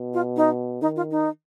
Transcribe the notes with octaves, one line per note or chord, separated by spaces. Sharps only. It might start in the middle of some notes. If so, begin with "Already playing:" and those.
Already playing: B2
F4
D#4
D#3 D#4
F4
D#4